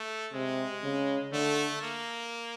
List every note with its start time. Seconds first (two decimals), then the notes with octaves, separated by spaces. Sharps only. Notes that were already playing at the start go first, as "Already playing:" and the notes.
Already playing: A3
0.33 C3 G#3
0.84 C#3
1.33 D3 A3
1.82 A#3